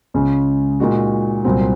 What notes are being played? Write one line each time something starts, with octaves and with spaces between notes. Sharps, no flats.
C#2 C#3 G#3 C#4
A#2 G#3 D#4 F#4
C2 A#2 F#3 C4